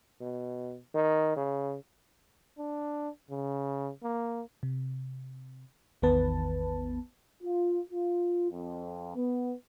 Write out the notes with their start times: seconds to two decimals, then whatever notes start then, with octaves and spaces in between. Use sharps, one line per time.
0.21 B2
0.95 D#3
1.37 C#3
2.58 D4
3.30 C#3
4.03 A#3
4.63 C3
6.02 A1 E2 D#3 B3 B4 A5
7.43 F4
7.90 F4
8.51 F2
9.15 B3